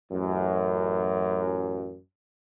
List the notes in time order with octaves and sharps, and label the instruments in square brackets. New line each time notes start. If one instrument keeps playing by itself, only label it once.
[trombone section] A1 F#2